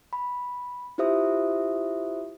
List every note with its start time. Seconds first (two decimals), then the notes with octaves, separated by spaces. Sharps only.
0.13 B5
0.98 E4 F4 G4 C5 E5 D#6